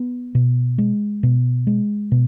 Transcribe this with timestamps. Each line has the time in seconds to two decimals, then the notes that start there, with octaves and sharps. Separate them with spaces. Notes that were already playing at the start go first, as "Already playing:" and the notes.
Already playing: B3
0.35 B2
0.78 G#3
1.23 B2
1.67 G#3
2.12 B2